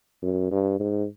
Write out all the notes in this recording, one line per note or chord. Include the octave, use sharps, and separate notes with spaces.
F#2
G2
G#2